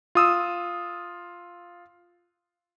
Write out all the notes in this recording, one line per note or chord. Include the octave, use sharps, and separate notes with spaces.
F4 D#6 E6